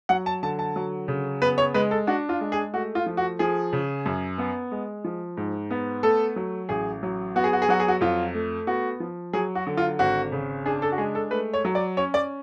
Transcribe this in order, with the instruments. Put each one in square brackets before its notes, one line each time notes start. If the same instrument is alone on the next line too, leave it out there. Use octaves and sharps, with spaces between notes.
[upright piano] F#3 F#5
A5
D3 A5
A5
F#3
C#3
B3 B4
C#5
G#3 B4
A4
D4 F#4
F4
G#3
G#4
A3 F#4
F4
F3
F#4
F3 G#4
C#3
F#2
B3
G#3
F3
G#2
B3
A3 A4
F#3
A1 G#4
F#3
B3 F#4
G#4
F#4
G#4
F#3 F#4
G#4
F#4
F2 F4
A3
B3 F#4
F3
F#3 G#4
F#4
D3
F4
G#1 F#4
C#3
D4 G#4
A4
F#4
G#3 G#4
A4
A3 B4
C#5
F#3
D5
C#4 C#5
D5